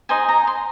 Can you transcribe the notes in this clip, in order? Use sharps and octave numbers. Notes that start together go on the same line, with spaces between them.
D#4 G#4 C5 D#5 G#5
A#5
C6